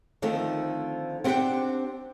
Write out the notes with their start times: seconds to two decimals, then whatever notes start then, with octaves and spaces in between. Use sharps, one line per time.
0.22 D3 D#3 F3 A3 C4 D#4
1.24 B3 C4 D4 G4 F#5 G5